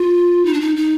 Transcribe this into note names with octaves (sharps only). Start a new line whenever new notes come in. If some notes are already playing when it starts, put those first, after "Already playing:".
Already playing: F4
D#4
D4
D#4
D#4